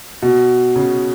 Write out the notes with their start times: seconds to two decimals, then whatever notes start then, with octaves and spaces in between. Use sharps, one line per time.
0.22 B2
0.76 C#3